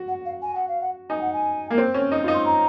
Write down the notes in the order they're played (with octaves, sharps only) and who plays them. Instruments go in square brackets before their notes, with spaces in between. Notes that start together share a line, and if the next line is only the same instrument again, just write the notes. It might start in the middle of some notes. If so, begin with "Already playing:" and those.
Already playing: [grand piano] F#4
[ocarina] F#5
F5
G#5
F#5
F5
F#5
[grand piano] D#4 [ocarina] G#5
[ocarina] F#5
G#5
[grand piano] A#3
C4
C#4
D#4
F4
D#4
[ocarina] C6
A#5